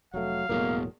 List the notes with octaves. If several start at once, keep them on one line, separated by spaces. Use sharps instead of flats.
F1 F#3 A3 F5
E1 A2 F#3 A#3 B3 G#4 A#4